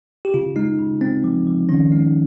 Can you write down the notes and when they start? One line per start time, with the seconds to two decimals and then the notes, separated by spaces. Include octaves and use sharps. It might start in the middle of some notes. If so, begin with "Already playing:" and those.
0.25 G4
0.34 C#3 F4
0.56 G#3 D#4
0.79 C#3
1.01 G#3 C4
1.24 F3
1.47 F3
1.69 D#3 C#4
1.92 G#3 D#4